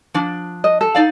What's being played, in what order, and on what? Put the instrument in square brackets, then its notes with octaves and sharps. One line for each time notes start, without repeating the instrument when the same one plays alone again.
[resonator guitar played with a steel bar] F3 D4
[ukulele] D#5
A4
[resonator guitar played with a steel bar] D#4 D5 F5